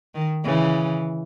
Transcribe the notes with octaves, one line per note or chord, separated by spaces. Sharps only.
D#3
C#3 E3